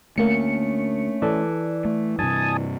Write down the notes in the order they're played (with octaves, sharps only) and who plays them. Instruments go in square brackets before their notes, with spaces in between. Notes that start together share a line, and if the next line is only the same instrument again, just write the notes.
[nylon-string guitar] D2 [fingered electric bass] A3 [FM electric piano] A#3 C#7 [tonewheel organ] C#4
[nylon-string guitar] E3 A4 [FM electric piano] D5
[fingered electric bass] A3
[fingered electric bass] G2 C3 [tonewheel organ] G#5 A5 D#6